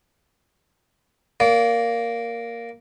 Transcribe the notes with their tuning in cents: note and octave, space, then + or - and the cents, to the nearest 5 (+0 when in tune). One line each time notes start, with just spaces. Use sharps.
A#3 +0 D5 -30